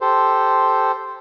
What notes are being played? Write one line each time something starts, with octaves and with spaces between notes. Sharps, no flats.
G4 A4 C5